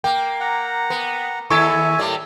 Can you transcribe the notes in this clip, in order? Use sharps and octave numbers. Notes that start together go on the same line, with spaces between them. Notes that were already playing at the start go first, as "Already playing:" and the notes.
A#3 G5
F#5 A#5
B3
D#2 E4 A4 E5 G#5 C#6 G#6
A2 G3 A#3